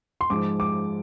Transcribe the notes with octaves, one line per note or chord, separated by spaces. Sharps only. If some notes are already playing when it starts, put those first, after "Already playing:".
C6
G#2 F3 G#3 D6
D6